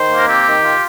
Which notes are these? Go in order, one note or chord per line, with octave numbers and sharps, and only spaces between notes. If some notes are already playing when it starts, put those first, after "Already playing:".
Already playing: D#3 C5
A#3
A#4
C4 G4
D#3
F4